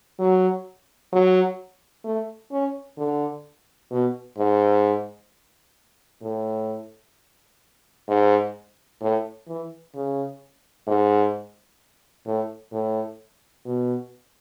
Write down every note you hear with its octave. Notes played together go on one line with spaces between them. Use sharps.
F#3
F#3
A3
C#4
D3
B2
G#2
A2
G#2
A2
E3
C#3
G#2
A2
A2
B2